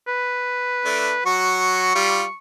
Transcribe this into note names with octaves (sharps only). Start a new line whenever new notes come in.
B4
A3 D4
F#3 F#4 C#6
G3 F4